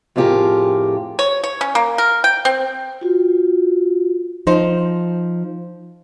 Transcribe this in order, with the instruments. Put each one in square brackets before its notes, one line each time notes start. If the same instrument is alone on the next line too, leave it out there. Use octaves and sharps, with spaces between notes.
[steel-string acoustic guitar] F2 A2 F4 G4 G#4 A#4
[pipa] C#5
C#5
C#4
A#3
A#4
G5
C4
[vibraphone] F4 F#4
[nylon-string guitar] F3 D#4 C5